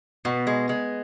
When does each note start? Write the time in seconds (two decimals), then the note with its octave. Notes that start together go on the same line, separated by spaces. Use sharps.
0.25 B2 B3
0.47 G#3
0.69 G#3